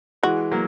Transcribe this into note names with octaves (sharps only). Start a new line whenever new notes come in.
E3 G#3 F#4
F#3 A#3